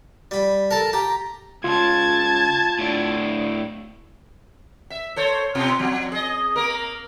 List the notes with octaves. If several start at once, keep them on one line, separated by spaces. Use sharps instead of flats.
G3 B5
A4 A#4 A5
G4 A#5
C#2 F4 A5 G#6
A2 D4
E5
A4 C5 C#5
B2 C4 F4
F3
G#4 D#5
A#3 A#4